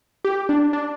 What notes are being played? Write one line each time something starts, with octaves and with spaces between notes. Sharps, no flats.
G4
D4
D4